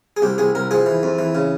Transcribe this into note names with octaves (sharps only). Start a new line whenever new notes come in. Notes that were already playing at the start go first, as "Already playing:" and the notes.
G#4
C2 G4
C2 G#4
C2 A#4
F3 G#4
E3
F2
E3
C#3